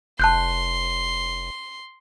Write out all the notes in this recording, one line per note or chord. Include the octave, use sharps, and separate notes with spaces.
F1 A5 C6 F#6 G6